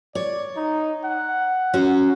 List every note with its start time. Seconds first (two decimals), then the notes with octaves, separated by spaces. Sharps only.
0.15 C#5 D5
0.57 D#4
1.04 F#5
1.74 C#4 F#4